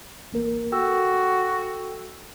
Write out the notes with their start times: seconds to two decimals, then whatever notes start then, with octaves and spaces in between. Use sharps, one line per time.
0.32 A1 A#3 A#4
0.72 F#4 A4 G5 E6